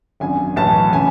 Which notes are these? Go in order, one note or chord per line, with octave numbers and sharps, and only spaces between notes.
G#1 F#2 D3 G#5
B1 A2 E3 A5
C#3 E3 G#5